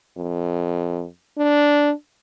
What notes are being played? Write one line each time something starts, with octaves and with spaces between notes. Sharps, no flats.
F2
D4